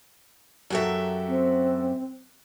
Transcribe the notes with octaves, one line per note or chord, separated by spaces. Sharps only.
F#2 F#3 F#4 G4 A4 E5
C4